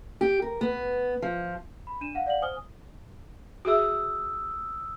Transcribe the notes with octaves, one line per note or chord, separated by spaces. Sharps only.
G4
A#4
B3
F3
B5
D4 D#7 E7
F5 F#5
D5 F5 F#5 F#7
C5 G#5 D#6 F6 G7
F#4 G#4 E5 D#6 E6